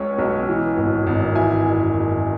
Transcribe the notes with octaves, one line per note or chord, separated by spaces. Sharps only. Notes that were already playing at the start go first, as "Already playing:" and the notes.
Already playing: C#2 G#3 C#4 C#5
B1
E3
G#1
G#1
E3 E5 G#5
F#1
F#1